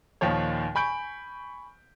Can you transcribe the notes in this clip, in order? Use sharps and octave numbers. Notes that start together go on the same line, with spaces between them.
D#2 A#2 D#3 F3 C#5
G#5 B5 C#6 G6 D7